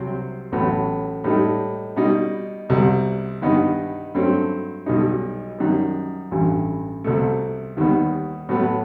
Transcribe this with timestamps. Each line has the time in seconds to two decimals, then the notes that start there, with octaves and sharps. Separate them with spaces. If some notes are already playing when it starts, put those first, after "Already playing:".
Already playing: C2 C3 F#3 C4
0.52 A1 A2 F#3 B3
1.24 A2 G3 D#4
1.96 B2 G3 D#4
2.69 C2 B2 G3
3.42 G2 D#3 G3 B3 D#4
4.15 G2 F#3 A3 C4
4.86 B1 B2 G3 D#4
5.59 F#2 D#3 G3
6.31 A1 G2 E3
7.04 C2 B2 A3
7.77 D#2 D#3 G3 B3
8.49 A2 F#3 B3